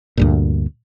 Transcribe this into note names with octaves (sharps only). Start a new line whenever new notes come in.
D2 G2 A#2